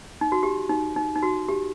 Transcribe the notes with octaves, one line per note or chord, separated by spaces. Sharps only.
D#4
F#4
G4
D#4
D#4
D#4
F#4
G4